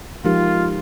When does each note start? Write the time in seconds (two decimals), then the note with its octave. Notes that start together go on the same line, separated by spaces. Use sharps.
0.25 F3 G#3 D#4 F4 G4 A#4